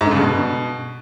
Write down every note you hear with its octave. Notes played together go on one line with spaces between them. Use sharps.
G#2
D3
C#3
G2
B2